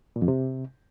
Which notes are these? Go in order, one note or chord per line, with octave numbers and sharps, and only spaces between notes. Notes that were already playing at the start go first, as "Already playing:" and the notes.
A#2
F2
C3